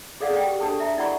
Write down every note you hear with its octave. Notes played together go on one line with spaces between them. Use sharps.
G#4 A4 D5 F5 F#5
D5 G5
G4
D4 G4 A4 A5
E5 A#5
E4 D5 F#5 B5 C#6